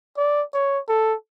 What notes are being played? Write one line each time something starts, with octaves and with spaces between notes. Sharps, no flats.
D5
C#5
A4